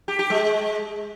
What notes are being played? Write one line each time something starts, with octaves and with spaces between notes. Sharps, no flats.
G4
G4
G#3